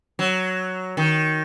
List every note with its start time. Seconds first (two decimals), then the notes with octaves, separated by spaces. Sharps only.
0.19 F#3
0.97 D#3